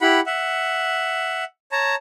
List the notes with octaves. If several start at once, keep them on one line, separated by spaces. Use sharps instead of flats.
E4 G4 F#5 B5
E5 F#5
C#5 A5 A#5